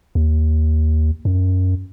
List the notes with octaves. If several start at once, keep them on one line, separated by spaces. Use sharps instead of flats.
D#2
F#2